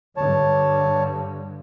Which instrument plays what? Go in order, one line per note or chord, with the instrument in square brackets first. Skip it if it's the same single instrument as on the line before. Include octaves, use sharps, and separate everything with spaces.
[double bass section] G2 D3 [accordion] C#5 A5